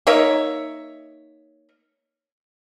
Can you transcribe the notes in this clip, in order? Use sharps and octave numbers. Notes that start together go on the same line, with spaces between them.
A#3 D#4 C#5 E5